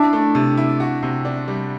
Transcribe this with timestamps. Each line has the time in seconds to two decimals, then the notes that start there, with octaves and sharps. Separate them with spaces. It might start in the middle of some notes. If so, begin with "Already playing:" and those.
Already playing: D4 E4
0.13 A3
0.35 C3
0.57 E4
0.80 F#4
1.03 C3
1.25 D4
1.48 G3